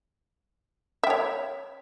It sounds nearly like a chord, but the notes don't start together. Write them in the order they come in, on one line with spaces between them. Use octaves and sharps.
E5 G5 C#5